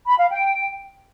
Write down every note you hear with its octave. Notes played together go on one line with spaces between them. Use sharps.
B5
F5
G5